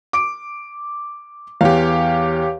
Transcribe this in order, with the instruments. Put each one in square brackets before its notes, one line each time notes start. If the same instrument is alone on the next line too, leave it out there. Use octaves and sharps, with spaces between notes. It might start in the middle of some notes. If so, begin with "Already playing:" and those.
[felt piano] D6 D7
[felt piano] E2 [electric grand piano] G4 C#5 F5